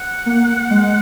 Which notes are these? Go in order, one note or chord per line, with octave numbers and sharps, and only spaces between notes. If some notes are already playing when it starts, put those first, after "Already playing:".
Already playing: F#5
A#3
G#3